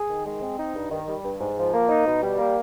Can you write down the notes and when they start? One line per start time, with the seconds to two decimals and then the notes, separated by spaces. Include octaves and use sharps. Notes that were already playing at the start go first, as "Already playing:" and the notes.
Already playing: G#4
0.09 D#3
0.25 G#3
0.42 C4
0.58 D#4
0.75 G2
0.91 D#3
1.07 G3
1.24 G2
1.40 G#2
1.56 F3
1.73 A#3
1.89 D#4
2.06 B2
2.22 G3
2.38 A#3